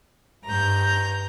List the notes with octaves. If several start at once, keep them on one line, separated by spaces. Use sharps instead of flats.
G2 A#5 G6